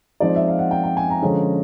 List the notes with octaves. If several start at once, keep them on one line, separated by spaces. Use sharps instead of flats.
F3 G#3 C4 D#4 D5
E5
F5
F#5
G5
G5
G#5
A#5
D3 F3 G#3 C#4